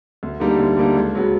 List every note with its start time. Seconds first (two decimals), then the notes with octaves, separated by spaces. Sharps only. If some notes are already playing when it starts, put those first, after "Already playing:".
0.23 D2
0.40 D3 G3 A#3 D#4
0.59 D2
0.77 D3 G3 A#3 D#4
0.95 C#2
1.14 C#3 F#3 B3